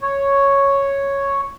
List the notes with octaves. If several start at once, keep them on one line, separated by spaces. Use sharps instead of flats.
C#5